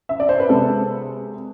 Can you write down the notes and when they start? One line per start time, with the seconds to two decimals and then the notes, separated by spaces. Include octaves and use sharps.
0.09 E5
0.20 D5
0.29 C5
0.40 B4
0.49 C3 G#3 B3 A4